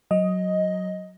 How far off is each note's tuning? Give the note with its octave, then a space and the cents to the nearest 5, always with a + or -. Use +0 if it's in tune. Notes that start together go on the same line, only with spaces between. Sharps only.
F#3 +0 D#5 +10